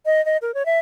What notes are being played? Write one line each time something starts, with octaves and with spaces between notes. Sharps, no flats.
D#5
D#5
A#4
C#5
E5